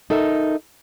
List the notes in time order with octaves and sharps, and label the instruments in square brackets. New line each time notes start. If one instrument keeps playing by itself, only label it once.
[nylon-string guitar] D#4 A4 A#4 E5